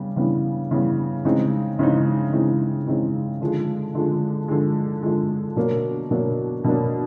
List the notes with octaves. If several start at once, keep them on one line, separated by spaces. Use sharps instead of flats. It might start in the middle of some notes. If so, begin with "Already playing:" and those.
Already playing: C#3 G3 B3
C#3 E3 G3 B3
C#3 E3 G3 B3
C#3 E3 G#3 C4 D#4
C#3 E3 G#3 C4 D#4
C#3 E3 G#3 C4 D#4
C#3 E3 G#3 C4 D#4
D3 F3 G#3
D3 F3 G#3
D3 F3 G#3
D3 F3 G#3
B2 F#3 A#3 D4
B2 F#3 A#3 D4
B2 F#3 A#3 D4